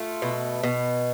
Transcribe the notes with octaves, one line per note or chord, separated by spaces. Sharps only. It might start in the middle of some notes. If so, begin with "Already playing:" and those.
Already playing: A3 F4
B2
B2